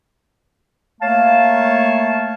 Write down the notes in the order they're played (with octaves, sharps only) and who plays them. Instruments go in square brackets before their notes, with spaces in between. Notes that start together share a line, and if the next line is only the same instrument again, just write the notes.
[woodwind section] A3 A#3 C#5 F5 A5